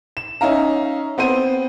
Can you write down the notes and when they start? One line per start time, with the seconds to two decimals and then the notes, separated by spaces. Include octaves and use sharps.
0.17 E7
0.41 C#4 D#4 E5 F5 A#5
1.18 B3 C4 C5 D#7